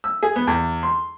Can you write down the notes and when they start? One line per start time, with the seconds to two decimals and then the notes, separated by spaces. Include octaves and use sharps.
0.04 E6
0.23 G#4
0.36 B3
0.47 E2
0.83 C6